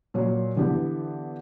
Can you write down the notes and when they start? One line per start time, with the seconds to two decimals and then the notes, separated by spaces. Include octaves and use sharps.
0.14 A#2 F#3 A#3
0.56 D3 E3 B3 G4